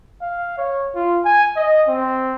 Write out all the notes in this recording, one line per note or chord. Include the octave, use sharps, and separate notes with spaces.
F5
C#5
F4
G#5
D#5
C4